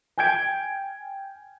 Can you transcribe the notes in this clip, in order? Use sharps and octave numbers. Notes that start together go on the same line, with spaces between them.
G5 G#5 G6 G#6 D7